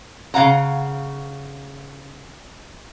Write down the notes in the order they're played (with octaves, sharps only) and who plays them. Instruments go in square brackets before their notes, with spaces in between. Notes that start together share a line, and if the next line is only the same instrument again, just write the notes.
[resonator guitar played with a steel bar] C#3 F5 F#5 A#5